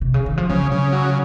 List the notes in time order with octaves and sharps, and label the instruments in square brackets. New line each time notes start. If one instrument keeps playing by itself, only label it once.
[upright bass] C3
C#3
D#3
F3
[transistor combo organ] C#3 [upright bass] F#3
[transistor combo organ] C#3
F#3